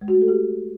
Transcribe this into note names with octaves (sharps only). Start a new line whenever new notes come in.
G#3
F#4
A3
A4
G4